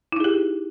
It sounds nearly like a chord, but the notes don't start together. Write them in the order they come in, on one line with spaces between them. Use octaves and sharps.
E4 D#4 G#4 G4